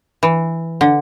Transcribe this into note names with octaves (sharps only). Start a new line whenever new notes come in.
E3
D3